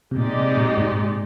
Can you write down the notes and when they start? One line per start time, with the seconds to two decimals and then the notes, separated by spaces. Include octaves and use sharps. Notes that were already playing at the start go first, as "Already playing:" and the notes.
0.11 C3
0.16 A#2 G#3 C4 D#4 G4 D5
0.37 C3
0.57 A#2
0.78 G#2